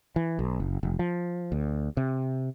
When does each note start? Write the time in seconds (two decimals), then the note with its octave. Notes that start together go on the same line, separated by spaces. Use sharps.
0.16 E3
0.39 B1
0.60 F#1
0.83 F1
0.99 F3
1.52 D2
1.97 C3